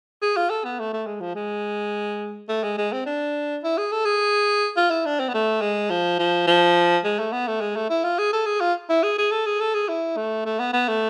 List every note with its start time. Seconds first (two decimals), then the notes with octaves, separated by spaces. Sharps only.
0.22 G#4
0.37 F4
0.50 A4
0.64 B3
0.79 A3
0.93 A3
1.07 G#3
1.21 F3
1.35 G#3
2.49 A3
2.63 G#3
2.78 G#3
2.92 C4
3.06 D4
3.63 E4
3.78 G#4
3.92 A4
4.05 G#4
4.77 F4
4.90 E4
5.05 D4
5.20 C4
5.29 B3
5.34 A3
5.61 G#3
5.90 F3
6.19 F3
6.47 F3
7.04 G#3
7.19 A3
7.32 B3
7.47 A3
7.61 G#3
7.76 A3
7.90 E4
8.04 F4
8.19 G#4
8.33 A4
8.46 G#4
8.60 F4
8.89 E4
9.03 G#4
9.18 G#4
9.31 A4
9.46 G#4
9.60 A4
9.74 G#4
9.89 E4
10.17 A3
10.45 A3
10.59 B3
10.73 B3
10.88 A3